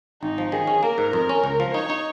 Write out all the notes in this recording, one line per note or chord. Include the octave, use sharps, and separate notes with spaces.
G#1 D#4
F3
D#3 G#4
C#4
A#3 A#4
G#2
F2 A#4
C#4
C#2
F3
D#4 C#5
D#4